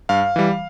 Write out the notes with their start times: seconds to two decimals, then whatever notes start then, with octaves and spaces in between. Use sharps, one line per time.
0.09 G2 F5
0.36 E3 G3